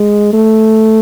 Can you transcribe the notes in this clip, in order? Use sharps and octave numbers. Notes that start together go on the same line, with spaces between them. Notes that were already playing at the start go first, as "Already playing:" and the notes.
Already playing: G#3
A3